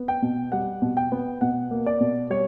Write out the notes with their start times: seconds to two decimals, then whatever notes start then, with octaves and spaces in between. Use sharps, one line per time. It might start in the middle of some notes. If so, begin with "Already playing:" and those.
Already playing: B3
0.08 G5
0.22 B2
0.52 G3 F#5
0.82 B2
0.97 G5
1.12 B3
1.41 B2 F#5
1.71 A#3
1.86 D5
2.00 B2
2.30 G3 C#5